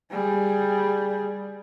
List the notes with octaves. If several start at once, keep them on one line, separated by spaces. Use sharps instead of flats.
G3 G#4